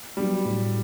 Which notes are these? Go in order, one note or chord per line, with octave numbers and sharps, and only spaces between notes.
F#3 G3 B3
A2